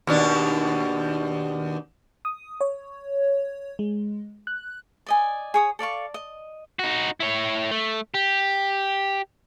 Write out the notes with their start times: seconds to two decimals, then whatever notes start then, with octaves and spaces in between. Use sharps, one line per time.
0.07 D#2 B2 D4
2.25 D#6
2.61 C#5
3.79 G#3
4.47 F#6
5.07 D5 D#5 G#5
5.54 G#4 C#5 D#6
5.79 A4 D5 F5 C#6
6.14 D#5
6.79 D#4 F#4
7.20 E4 C#5
7.71 A3
8.14 G4